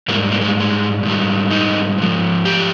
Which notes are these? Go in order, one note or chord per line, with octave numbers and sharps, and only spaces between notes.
G#2 G3 A#3
A#3
G#3
G#3
G#2 D#3 G3
D#4
G#2 F3
G4